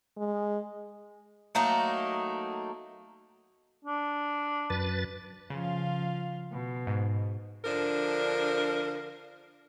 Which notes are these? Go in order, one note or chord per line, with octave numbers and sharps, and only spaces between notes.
G#3
F#3 A3 A#3 D#4
D4
F#2 B4 A6
C#3 F3 F4 F5
B2
G#2
D3 F3 D4 A#4